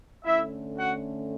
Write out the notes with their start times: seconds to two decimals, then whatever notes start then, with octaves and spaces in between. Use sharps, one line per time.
0.23 D3 A3 C#4 E4 E5
0.76 F#4 F#5